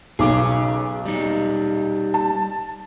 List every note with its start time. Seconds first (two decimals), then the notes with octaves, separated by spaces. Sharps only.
0.19 B1 G#4 C#5 D6
1.06 G3 D#4
2.14 A5